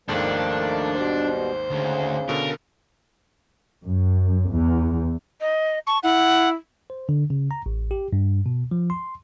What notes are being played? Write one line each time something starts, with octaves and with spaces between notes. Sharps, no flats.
G#1 D#2 G#2 D#3 F3 A3 D4
B2 G3 C5
D2 C#3
B2 D3 A#4
F#2
E2
D#5
A5 C#6
E4 F#5
C5
D3
C#3
A#5
A1
G4
G2
B2
F3
C6